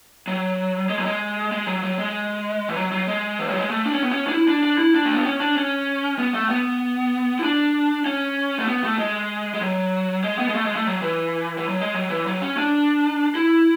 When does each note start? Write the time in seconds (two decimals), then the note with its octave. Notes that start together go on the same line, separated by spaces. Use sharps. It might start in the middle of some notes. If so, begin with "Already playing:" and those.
0.27 F#3
0.89 G#3
0.98 F#3
1.05 G#3
1.52 G#3
1.67 F#3
1.83 F#3
1.98 G#3
2.69 E3
2.76 F#3
2.92 F#3
3.07 G#3
3.39 E3
3.49 F#3
3.59 G#3
3.70 A3
3.86 D4
3.94 C#4
4.03 B3
4.11 C#4
4.27 D4
4.32 E4
4.48 D4
4.63 D4
4.78 E4
4.95 D4
5.05 A3
5.15 B3
5.26 C#4
5.41 D4
5.57 C#4
6.19 B3
6.34 A3
6.50 B3
7.39 E4
7.44 D4
8.06 C#4
8.59 A3
8.68 B3
8.84 A3
8.99 G#3
9.54 G#3
9.61 F#3
10.24 G#3
10.39 B3
10.49 G#3
10.55 A3
10.65 G#3
10.76 A3
10.86 F#3
11.02 E3
11.58 E3
11.68 F#3
11.80 G#3
11.94 F#3
12.10 E3
12.27 F#3
12.42 C#4
12.57 D4
13.35 E4